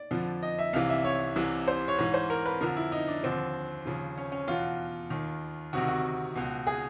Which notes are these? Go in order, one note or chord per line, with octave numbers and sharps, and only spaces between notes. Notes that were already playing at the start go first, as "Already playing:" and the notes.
Already playing: D5
F2 D3 F3
D#5
E5
C2 C3 E3 F5
E5
C#5
C2 C3 E3
C5
C#5
G#2 E3 C#5
C5
A#4
B4
F2 D3 F3 A#4
E4
D#4
D4
D#2 D3 F3 C4
D#2 C#3 F3
C#4
C#4
E2 B2 F4
D#2 D#3
D2 C3 D#3 F#4
F#4
C#2 B2
G#4